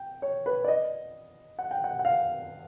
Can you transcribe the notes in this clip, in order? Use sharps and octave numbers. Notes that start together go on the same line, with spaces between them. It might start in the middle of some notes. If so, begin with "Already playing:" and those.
Already playing: G5
C#5
B4
D5
D#5
F#5
G5
F#5
F#5
F5